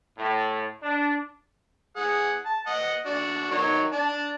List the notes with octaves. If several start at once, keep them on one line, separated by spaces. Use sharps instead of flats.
A2
D4
G#4 F#5
A5
D#5 F#5
D4 F#4
D#3 F#3 C#5
D4 A5